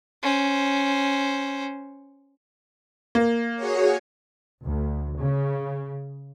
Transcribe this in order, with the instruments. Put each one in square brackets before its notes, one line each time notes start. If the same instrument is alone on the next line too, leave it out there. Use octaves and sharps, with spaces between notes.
[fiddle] C#4 C5
[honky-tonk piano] A#3
[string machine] F#4 G#4 C#5
[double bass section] D2
C#3